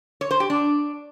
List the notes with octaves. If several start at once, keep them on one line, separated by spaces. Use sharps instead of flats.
C#5
C5
G4
D4